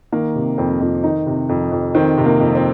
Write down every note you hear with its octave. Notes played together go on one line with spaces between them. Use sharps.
D#3 A#3
C3
F2 C4
F2
D#3 D#4
C3
F2
F2
D#3 C4
C3
A#3
F2
C4